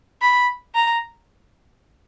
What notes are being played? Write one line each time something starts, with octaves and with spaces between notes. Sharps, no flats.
B5
A#5